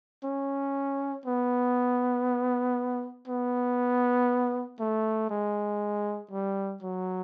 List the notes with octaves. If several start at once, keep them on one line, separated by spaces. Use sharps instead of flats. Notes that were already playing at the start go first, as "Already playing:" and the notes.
C#4
B3
B3
A3
G#3
G3
F#3